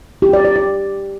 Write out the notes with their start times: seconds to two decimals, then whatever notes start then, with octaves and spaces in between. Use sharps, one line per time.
0.22 G4
0.33 D5
0.45 D5
0.56 D5